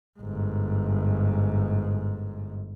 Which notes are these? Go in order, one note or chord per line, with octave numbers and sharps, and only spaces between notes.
G1 G#2